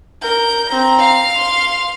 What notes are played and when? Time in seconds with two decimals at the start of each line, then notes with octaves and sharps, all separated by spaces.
0.22 A#4 G6
0.68 C4 A#5
0.98 F5 F6
1.35 C6